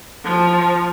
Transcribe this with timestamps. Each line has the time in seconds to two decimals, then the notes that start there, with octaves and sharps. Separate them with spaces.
0.24 F3